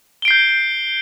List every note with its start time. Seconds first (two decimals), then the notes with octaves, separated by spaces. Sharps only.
0.22 G7
0.25 D7
0.28 C7
0.31 G6